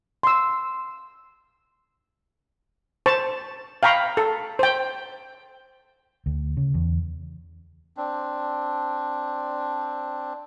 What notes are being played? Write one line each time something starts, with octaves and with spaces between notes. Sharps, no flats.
C6 E6
C5 A5 C#6
F5 G5 A#5 B5 C#6
A4
C5 G5
D2
C#3
E2
C4 D4